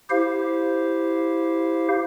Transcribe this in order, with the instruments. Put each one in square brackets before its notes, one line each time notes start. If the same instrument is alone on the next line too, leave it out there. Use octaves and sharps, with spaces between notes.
[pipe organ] E4 G4 C5 F5